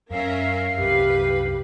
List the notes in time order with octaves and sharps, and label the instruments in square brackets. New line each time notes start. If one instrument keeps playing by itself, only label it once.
[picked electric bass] F#2 [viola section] C#4 A#4 E5 [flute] F5
[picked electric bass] C2 F#2 [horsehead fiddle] G4 [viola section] B4